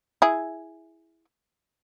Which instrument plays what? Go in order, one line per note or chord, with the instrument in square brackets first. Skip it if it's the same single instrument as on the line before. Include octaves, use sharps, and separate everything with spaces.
[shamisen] E4 G#4